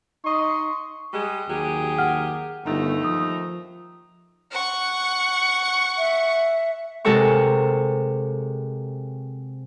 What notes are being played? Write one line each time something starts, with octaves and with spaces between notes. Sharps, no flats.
D#4 D#5 C6 C#6
G3 G#3
D#2 F#3 G4 G#4
F#5 F6
G1 D#2 A3 D#4
F3 D#6
F#5 C#6
E5
C3 G#3 A4 A#4 F#5 C#6